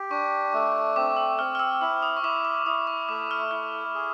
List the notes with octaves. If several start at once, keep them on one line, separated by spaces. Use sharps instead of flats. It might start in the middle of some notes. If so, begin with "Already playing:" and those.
Already playing: G4
D4 C#6
A3
C4 D6
E6
C4 F6
F6
E6
E4 E6
D#6
C#6
E4 D6
D6
E4 D#6
C#6
A3 D6
F6
E4 F6
G#4